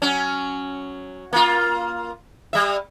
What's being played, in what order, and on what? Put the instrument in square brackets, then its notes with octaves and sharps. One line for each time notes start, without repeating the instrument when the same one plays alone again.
[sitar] F#3 C#4
A#3 F4
G3 E5